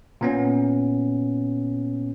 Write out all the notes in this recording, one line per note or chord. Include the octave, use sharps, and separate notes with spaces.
A#2 B3 C#4